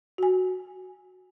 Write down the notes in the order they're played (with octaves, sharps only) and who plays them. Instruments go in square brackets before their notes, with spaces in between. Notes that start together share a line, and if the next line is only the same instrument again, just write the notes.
[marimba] F#4 G#5